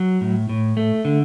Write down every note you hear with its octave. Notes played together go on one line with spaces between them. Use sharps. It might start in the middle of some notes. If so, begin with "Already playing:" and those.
Already playing: F#3
A2
A2
A3
D3